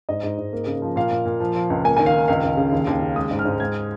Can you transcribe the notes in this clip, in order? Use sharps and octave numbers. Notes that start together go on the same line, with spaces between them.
G#2 D#5
G#2
G#2
A#3
C#3
F3
A#2 F5
A#2
A#2
F3
F3
C#2
A#3 G#5
D#3 G#5
F5
D#3
C#2 F5
C#2
C#3
D#2
D#2
C#3
G#3 D#6
G#2
F6
G#2
G#3 G#6